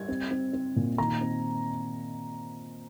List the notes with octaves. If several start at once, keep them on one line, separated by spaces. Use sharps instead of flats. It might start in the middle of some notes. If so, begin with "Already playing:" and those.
Already playing: G3 G#6
C4
C4
C4
A#2
D#3 A#5
C4